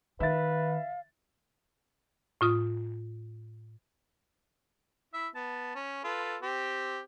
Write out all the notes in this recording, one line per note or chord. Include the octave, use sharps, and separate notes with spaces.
D#3 B4 E5 F5 A6
A2 F4 D#6
E4 E5
B3 A5
C#4
F4 A4 B4
C4 G4